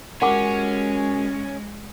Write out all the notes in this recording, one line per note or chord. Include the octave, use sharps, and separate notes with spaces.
G#3 C#4 F#4 G4 A#4 F#5 G#5 D6